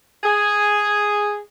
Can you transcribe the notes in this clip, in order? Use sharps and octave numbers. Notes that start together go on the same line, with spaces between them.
G#4